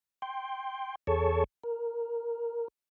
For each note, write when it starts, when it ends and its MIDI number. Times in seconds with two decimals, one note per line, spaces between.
0.22 0.95 79
0.22 0.95 84
1.07 1.44 40
1.07 1.44 68
1.07 1.44 69
1.07 1.44 73
1.07 1.44 81
1.07 1.44 85
1.64 2.68 70